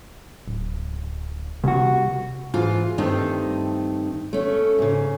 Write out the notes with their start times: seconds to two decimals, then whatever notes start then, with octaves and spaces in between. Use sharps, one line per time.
0.48 D1
1.64 C2 F#4
2.54 G#2 E3 F4
2.98 G2 D#3 A3 C4 D#4
4.33 A3 C#4
4.78 G#2 C#3